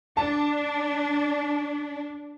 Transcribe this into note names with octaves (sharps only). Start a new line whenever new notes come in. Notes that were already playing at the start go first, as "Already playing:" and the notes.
D4 A5